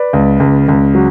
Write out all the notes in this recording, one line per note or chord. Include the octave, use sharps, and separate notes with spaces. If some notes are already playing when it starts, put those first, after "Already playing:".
Already playing: B4 D5
C#2
C#2
C#2
F#3